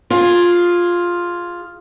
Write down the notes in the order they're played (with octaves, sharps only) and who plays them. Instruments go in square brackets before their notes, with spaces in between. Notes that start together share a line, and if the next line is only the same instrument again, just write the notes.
[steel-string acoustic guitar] F4 G#4